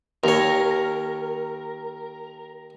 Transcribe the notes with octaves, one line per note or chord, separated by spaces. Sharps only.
D#2 A#4 C#5